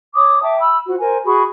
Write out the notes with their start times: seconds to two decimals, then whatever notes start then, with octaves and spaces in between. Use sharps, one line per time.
0.15 C#5 D6 D#6
0.43 E5 G5 A5 D6
0.60 B5 E6
0.87 F4 F#4 C5
0.99 A#4 C5 G#5
1.25 F#4 G#4 B5 C#6